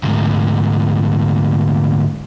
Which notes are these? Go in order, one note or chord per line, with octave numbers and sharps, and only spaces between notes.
D2 G#2